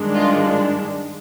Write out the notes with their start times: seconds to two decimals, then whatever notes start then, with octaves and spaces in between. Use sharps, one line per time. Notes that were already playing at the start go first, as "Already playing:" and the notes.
Already playing: G2 D#3 G#3 D4
0.15 F4